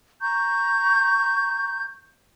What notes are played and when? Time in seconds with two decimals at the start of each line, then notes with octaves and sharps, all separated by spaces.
0.21 A#5 C#6 G6